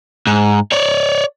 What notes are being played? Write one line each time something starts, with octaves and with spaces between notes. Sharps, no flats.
G#2
C#5 D5